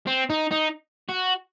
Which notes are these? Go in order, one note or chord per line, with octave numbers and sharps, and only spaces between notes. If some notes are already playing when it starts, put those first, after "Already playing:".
C4
D#4
D#4
F#4